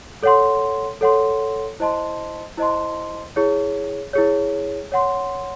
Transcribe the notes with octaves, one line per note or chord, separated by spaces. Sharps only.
A4 C#5 F#5 C6
A4 C#5 F#5 C6
E4 C5 D#5 A5 C6
E4 C5 D#5 A5 C6
E4 G#4 C#5
E4 G#4 C#5
C#5 F#5 C6